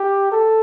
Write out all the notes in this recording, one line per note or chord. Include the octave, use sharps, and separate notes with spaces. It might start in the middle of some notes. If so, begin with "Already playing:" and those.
Already playing: G4
A4